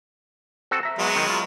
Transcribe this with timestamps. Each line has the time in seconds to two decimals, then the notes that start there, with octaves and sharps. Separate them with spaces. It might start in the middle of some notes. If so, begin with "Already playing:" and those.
0.71 C4 F#4 A4
0.83 E5 A#5
0.99 F#3 G#3 B3
1.16 D#3
1.30 F4